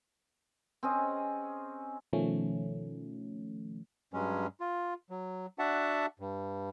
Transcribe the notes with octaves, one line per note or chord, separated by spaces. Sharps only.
C4 C#4 G#4 D#5
B2 D#3 F3 A3 C#4
G2 F#3 G#3 C#4
F4
F#3
D4 F#4 E5 F#5 A5
G2